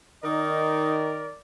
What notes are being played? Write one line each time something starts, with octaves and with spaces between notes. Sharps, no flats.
D#3 D#4 A#4 D5